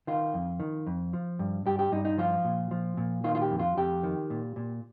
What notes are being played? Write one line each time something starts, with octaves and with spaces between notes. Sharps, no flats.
D#3 F4
F2
D#3
F2
F3
G2
G2 G4
G4
G2 D#4
D#4
F3 F4
A#2
F3
A#2
D#3 F4
F4
G4
F2
F4
F2 G4
D#3
A#2
A#2